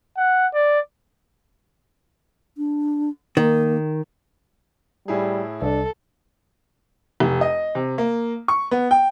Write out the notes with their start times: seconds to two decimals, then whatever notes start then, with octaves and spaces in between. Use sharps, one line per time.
0.17 F#5
0.54 D5
2.57 D4
3.37 D#3 A#3
5.08 A2 G3 E4 G#4
5.62 C2 D4 A4
7.20 F1
7.41 D#5
7.75 C3
7.98 A#3
8.48 C#6
8.71 B3
8.91 G5